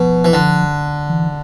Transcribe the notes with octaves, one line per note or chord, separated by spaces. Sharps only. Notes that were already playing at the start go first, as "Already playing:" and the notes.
Already playing: B2 F3
E3
D3
E3